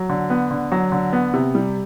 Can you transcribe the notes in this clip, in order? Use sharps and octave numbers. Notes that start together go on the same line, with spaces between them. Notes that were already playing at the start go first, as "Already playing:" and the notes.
Already playing: F#3
D3
B3
D3
F#3
D3
B3
C3
G3